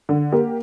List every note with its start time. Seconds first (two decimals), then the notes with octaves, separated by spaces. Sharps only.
0.09 D3
0.32 A#3 G4 A#4